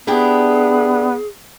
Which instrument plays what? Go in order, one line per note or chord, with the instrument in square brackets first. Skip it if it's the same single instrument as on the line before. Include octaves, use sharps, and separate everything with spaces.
[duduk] B3 [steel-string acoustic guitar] D4 E4 G4 [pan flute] G#4